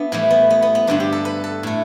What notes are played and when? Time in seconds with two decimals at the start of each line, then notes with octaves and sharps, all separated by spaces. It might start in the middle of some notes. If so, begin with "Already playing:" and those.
Already playing: B3 D4 E4
0.12 A2 E3 G3 A3
0.30 B3
0.50 B3
0.62 B3
0.75 B3
0.87 G2 D3 G3 D4
1.00 G4
1.12 A4
1.25 B4
1.44 A4
1.63 A2 A3